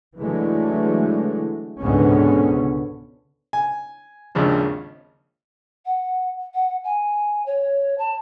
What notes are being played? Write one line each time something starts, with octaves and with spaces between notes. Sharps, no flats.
D3 E3 F#3 G#3 A3
C#2 G#2 B2 D3 B3 C#4
G#5
G#1 D#2 C#3 F3 D4
F#5
F#5
G#5
C#5
A5